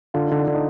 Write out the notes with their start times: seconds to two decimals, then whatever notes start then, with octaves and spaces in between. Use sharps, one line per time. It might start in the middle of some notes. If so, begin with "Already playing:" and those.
0.14 D3 F4
0.27 D3 D#4
0.40 D4
0.48 D3
0.54 D#4